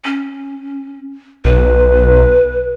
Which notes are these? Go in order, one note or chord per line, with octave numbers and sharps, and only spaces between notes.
C#4
B1 B4